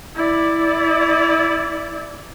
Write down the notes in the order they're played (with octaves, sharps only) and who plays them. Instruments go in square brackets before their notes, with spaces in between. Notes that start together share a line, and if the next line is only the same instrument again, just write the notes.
[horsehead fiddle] E4 D5